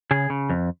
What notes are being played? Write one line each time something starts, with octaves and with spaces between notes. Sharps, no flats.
C#3 G#4
C#3
F2